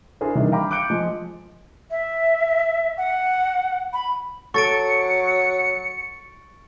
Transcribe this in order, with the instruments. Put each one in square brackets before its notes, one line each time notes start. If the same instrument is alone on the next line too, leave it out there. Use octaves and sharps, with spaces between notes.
[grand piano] D4 E4 G#4 A#4 C5
C3 D#3 E3 G3 A#3 D4
F5 G5 A#5 B5 D6
D6 F#6 G6 C#7 D7
F3 G#3
[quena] E5
F#5
B5
[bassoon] F#3 [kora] A4 [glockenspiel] C#6 A6 D7 [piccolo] C#7